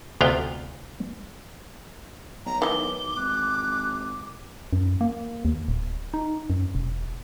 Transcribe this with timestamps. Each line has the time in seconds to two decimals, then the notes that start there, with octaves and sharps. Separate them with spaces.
0.21 D2 C3 B3 F4 F5 G5
2.46 B1 A#5
2.62 D#3 E3 D6 G7
3.17 G#1 F#6
4.73 F#2
5.01 A#3
5.45 D#2
5.68 D1
6.14 D#4
6.50 F#2
6.75 E1